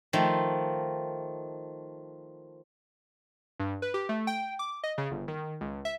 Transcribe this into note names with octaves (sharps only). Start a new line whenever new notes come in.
D#3 F3 A3
G2
B4
G4
A3
G5
D6
D#5
C#3
G1
D#3
C#2
E5